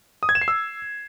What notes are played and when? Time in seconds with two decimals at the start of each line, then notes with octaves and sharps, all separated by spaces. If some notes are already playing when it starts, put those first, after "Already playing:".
0.23 D#6
0.29 G#6
0.35 E7
0.42 C7
0.48 E6